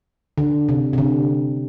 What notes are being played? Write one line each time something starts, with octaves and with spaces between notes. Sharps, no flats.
D3
C3
C3
D3